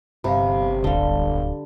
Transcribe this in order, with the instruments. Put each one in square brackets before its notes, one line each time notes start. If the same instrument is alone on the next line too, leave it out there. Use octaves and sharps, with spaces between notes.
[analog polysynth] G1 [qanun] C3 [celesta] F5 B5
[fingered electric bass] D1 [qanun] D3 G3 [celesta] F5 G7